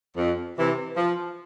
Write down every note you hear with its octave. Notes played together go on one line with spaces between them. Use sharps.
F2
C3 E3
F3